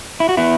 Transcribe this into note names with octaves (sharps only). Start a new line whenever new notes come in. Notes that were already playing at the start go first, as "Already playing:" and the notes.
E4
F#4
B3 E4